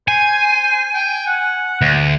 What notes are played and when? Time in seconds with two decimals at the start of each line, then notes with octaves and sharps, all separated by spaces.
0.08 C5 G#5
0.94 G5
1.27 F#5
1.82 D2